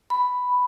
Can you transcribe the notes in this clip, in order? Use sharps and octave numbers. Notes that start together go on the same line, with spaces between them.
B5